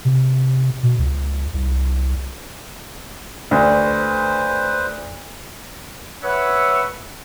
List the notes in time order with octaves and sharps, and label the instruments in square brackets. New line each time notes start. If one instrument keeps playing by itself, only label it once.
[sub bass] C3
B2
C#2
C2
[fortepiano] D2 [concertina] B4 C5
[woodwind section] B4 C#5 E5 F#5